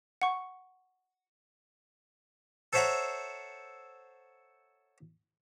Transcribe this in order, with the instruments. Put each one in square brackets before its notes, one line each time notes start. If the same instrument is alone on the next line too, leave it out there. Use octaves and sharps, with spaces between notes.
[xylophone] F#5 C#6
[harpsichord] A4 C5 C#5 E5 F#5 A#5